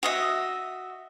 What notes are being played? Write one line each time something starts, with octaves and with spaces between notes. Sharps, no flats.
F#4 D#5 E5